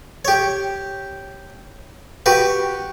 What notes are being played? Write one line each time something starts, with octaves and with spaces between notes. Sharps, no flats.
G4 C#5
F#4 G4 B4